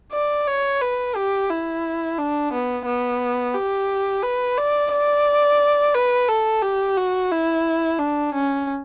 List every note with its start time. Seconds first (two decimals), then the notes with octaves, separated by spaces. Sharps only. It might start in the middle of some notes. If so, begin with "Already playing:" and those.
0.13 D5
0.47 C#5
0.81 B4
1.16 G4
1.50 E4
2.19 D4
2.53 B3
2.86 B3
3.55 G4
4.23 B4
4.58 D5
4.92 D5
5.95 B4
6.28 A4
6.62 G4
6.97 F#4
7.31 E4
7.99 D4
8.34 C#4